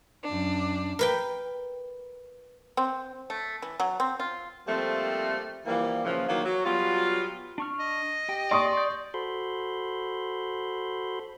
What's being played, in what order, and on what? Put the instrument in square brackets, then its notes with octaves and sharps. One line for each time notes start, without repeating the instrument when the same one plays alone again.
[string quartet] F#2 D4
[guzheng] A#4 B4 G5
[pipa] C4
A3
E3
F#3
C4
F4
[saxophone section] F3 G3 A3 A#3 C4
E3 F3 G3 A#3
A#2 C#3 E3 F3
D#3 E3 F#3 A#3
F#3
F#3 G3 B3 F4
[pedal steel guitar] D4 C#6 F6
[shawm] D#5
[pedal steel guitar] G4 G5
[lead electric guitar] D5 [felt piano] C6 C#6 D#6
[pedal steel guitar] G6
[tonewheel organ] F#4 A4 C5 B5 C6